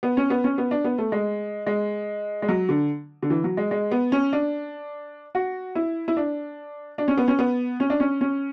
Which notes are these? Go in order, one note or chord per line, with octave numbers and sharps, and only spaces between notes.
B3
C#4
B3
C#4
B3
D4
B3
A3
G#3
G#3
G#3
F#3
D3
D3
E3
F#3
G#3
G#3
B3
C#4
D4
F#4
E4
E4
D4
D4
C#4
B3
C#4
B3
C#4
D4
C#4
C#4